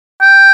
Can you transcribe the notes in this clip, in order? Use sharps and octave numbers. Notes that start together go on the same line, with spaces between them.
G5